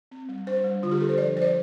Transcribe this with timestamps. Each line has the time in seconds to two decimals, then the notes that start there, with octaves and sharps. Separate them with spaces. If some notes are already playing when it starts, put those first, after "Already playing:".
0.11 C4
0.29 G3
0.47 D4 C5
0.64 G3
0.83 D3 F4
0.92 G4
1.00 D4 A4
1.09 C5
1.18 F3 D5
1.36 F3 C5
1.42 D5